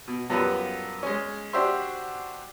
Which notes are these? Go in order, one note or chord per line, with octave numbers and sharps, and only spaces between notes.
B2
F#2 G3 B3 F4 B4 A5
G#3 C#4
D4 F#4 G4 C5 E5 C6